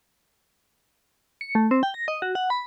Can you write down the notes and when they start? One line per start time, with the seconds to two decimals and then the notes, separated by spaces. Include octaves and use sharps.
1.41 C#7
1.55 A3
1.71 C4
1.83 G5
1.94 A#6
2.08 D#5
2.22 F#4
2.35 F#5
2.50 B5